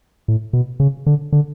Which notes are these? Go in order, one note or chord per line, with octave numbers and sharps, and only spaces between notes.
A2
B2
C#3
D3
D3